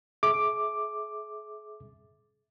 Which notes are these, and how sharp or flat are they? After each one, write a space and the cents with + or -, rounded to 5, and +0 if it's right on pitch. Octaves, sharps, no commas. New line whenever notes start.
G#4 +40 E5 -10 D6 +5